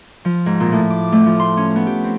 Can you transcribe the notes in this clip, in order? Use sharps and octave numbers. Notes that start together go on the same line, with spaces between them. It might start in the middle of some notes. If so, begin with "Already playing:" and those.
F3
G#2
A#2
A2
D6
A3
F3
C6
C#4
B3
G4
C4